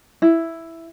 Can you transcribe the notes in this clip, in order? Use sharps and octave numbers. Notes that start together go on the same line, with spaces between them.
E4